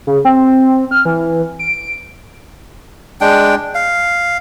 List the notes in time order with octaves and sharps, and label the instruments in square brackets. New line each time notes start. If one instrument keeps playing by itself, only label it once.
[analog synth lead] C#3
C4
F6
E3
D7
[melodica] G#3 D4 G5
F5